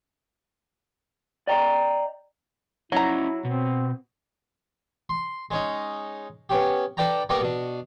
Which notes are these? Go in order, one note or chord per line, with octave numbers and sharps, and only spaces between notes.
D5 D#5 G5 A#5
F#3 C#4 D#4 E4 A#5
B2 C4
C6
G#3 C#4 D#4
B3 C#4 G4
D4 A4 B4 D5 G5 A#5
G3 A#3 B3 A#4 D5 C#6
B2 D4